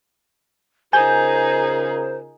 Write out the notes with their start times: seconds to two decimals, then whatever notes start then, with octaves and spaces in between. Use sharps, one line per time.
0.93 C#3 D#4 F4 G#4 A#4 C5 G#5 G6